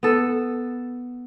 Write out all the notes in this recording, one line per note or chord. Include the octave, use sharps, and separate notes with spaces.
B3 A4